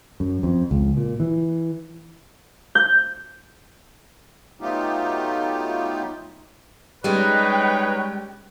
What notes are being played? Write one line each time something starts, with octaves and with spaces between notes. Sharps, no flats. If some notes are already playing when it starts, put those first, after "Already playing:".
F#2
F2
C#2
A#2
E3
G6
F#3 A3 B3 D#4 F4 G4
G3 G#3 C#4 D#4 B4 C#5 G5 F#6